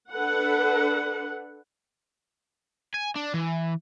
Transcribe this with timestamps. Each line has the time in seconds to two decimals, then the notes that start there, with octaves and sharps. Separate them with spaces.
0.12 D4 A4 B4 F#5
2.94 G#5
3.16 D4
3.34 E3